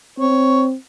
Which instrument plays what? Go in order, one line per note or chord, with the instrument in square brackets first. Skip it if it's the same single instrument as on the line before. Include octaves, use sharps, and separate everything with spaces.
[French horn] C4 [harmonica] C#5